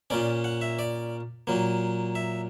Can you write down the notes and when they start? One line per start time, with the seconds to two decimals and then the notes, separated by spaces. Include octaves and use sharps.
0.10 A#2 A#3 C#4 D5
0.44 F#5
0.61 E5
0.79 D5
1.47 A#2 F#3 A#3
2.15 E5